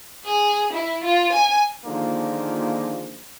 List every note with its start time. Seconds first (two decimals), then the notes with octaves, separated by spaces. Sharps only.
0.25 G#4
0.73 E4
1.04 F4
1.33 G#5
1.85 A#2 D3 D#3 F3 G#3 A#3